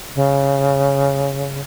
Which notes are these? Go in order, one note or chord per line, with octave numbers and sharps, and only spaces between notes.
C#3